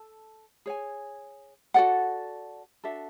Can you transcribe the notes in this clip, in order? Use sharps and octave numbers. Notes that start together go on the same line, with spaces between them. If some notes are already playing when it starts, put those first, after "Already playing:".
Already playing: A4 A5
G#4 C#5 G#5
F#4 A4 D5 F#5
D4 F#4 A4 E5